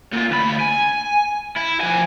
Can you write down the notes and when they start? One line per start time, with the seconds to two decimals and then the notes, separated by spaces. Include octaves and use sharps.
0.13 A#2 F4
0.31 D2 B5
0.60 G#5
1.56 E4
1.80 F3 G#5